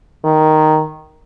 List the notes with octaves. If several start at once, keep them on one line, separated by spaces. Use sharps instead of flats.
D#3